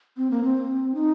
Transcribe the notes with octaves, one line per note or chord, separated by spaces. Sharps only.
C4
A#3
C4
D#4